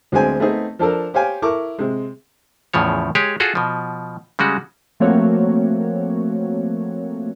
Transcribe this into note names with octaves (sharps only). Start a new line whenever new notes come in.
D2 F#3 G#3 B3 C4 G#5
A3 B3 C4 D#4 G#4
F3 D4 A4 A#4
G4 C5 C#5 F5 G5 G#5
E4 A4 A#4 C#6 D6
C3 G#3
E2 A2 C#3 F3 C#5
G#3 G4 G#4 C#5
F4 F#4 G#4 A4
B2 F3
C#3 G3 G#3 F#4
F3 A3 A#3 C4 F#4 C#5